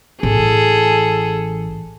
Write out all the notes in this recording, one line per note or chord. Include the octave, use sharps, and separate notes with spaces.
A1 G#4 A4